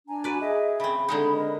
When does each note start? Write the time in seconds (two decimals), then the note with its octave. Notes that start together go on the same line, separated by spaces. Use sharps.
0.08 D4 G#5 A#5
0.24 F#4 B4 D5
0.41 G#4 D#5 E5
0.80 C#3 C4 B5
1.08 D3 G#3 D#4
1.32 A#4 B4 D#5